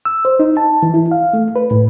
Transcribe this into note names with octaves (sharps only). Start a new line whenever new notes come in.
E6
C5
D#4
A5
E3
E4
F5
A3
B4
A2